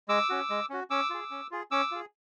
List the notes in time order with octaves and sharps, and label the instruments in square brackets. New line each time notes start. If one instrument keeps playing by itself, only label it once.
[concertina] G#3 D6 E6
C#4 F#4
G#3
C#4 F#4
C#4 D6 E6
F4 G#4
C#4
F4 G#4
C#4 D6 E6
F4 G#4